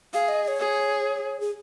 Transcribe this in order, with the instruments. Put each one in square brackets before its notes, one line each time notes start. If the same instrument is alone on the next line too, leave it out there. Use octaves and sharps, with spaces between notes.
[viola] G#4 [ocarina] F5
[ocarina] D#5
D#5
C#5
[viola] G#4
[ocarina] G#4